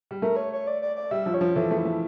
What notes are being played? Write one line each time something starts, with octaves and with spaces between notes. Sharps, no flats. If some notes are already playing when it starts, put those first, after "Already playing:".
G3
A3 A#4
C#5
C#5
D5
D5
D5
G3 E5
F3
C#5
F3
E3 A4
A3
E4
A3